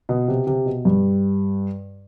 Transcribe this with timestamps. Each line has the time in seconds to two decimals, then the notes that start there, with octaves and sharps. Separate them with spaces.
0.09 B2
0.28 C3
0.47 C3
0.66 B2
0.85 G2